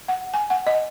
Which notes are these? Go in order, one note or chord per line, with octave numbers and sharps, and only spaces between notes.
F#5
G#5
F#5
D#5